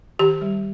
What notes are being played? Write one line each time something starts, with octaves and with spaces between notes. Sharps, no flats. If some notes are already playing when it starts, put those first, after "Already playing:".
D#3 G4
G3